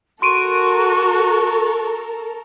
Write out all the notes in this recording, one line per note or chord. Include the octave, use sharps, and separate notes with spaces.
F#4 A4 A#4 C6 C#6 D7 D#7